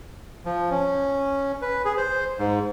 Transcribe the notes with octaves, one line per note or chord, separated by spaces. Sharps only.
F3
C#4
B4
G#4
C5
G#2